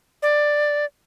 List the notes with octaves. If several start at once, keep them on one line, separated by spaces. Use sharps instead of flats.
D5